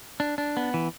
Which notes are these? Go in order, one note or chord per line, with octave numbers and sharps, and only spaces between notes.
D4
D4
B3
E3